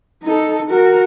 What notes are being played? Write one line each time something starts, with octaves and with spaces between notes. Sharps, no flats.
D#4 A4
F#4 A#4